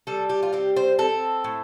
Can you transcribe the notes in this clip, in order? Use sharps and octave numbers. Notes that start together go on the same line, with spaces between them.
G3 A4
G4
F4
C4 G4
C5
C4 A4
A2